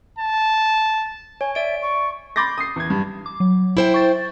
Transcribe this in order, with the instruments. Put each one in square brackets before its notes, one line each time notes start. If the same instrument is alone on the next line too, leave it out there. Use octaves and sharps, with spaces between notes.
[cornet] A5
[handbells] C#5 [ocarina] G#5
[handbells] D5 D7 [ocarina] E5
[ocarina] C#6
[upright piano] B5 C6 D6 G6 A6 A#6
D#6 C7
E2 G#6
G2
[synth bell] D6
F#3
[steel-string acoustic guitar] E4 C5 G5
[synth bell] C#6 A6